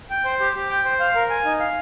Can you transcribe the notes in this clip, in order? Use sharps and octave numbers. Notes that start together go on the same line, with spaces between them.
G5
C5
G4
G4
G5
C5
F5
A#4
G#5
D#4
F5